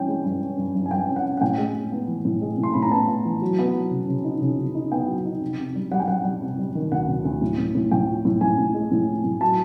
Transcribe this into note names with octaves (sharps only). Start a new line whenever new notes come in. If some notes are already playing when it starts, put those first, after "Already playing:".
Already playing: G2 E3 C#4 G5
G#3
G2
C#4
G2
G2
G#5
G2 G5
C#4
F#5
C#4
F#5
A2 G5
G#3
G#3
B3
E3
A2
G#3
A2
C6
A2 B5
A#5
B3 A5
B3
E3
F#3
B3
F#3
C#3
C#3
D#4
C#3
C#3
D#4
B3 G5
F#3
D#4
C3
C3
G3
G3 F#5
G5
G3 F#5
G3
C3
G3
D#3
D2 F#5
D2
D2
A2
A2
A2
A2 G5
F3
A2
A2 G#5
A2
G#3
A2
F3
A2
F#3 A5